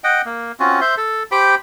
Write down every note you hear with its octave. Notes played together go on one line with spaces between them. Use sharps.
D#5 F#5 G5
A#3
C4 C#4 F4 F#4
C5 E5 C6
A4
G4 C5 G5 B5